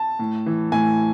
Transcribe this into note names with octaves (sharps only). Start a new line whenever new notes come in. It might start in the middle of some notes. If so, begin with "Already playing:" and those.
Already playing: A5
A2
E3
A2 G#5